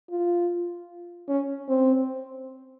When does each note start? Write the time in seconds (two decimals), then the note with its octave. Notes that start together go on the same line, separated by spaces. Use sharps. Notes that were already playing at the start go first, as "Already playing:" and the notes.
0.10 F4
1.29 C#4
1.69 C4